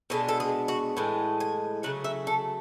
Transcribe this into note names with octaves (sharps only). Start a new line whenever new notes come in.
B2 G#3 B3 D4 A4
A4
G#4
F#4
A2 E3 G#3
G#5
C#3 F#3 A3 F#5
E5
A4